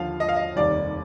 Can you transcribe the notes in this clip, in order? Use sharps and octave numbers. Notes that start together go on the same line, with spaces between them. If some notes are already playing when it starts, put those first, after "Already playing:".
Already playing: D#2 D3 F3 F5
D#5
F5
D#5
F1 D#2 D#3 G3 D5